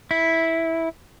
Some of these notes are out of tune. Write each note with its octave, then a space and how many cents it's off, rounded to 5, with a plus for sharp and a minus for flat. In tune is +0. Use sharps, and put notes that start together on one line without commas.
E4 -10